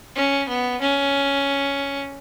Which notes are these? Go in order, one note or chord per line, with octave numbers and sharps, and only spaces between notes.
C#4
B3
C#4